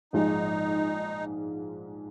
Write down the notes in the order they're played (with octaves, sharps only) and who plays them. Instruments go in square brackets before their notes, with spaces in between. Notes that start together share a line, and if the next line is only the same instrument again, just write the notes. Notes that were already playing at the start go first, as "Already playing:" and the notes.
[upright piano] A#1 G#2 F3 G#3 [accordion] D#4